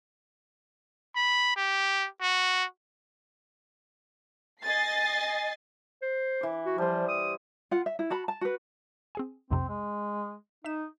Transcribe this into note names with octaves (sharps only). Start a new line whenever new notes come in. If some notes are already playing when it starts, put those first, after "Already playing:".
B5
G4
F#4
D#5 G#5 A6 C7
C5
E3 D6
F#4
F3 G3 C5
D#6
F4 F#5
E5
E4
F#4 A5 B5
A5
F#4 B4
C4 G#4 G#5
B1 F2 C3 C4
G#3
D#4 E5 B6 E7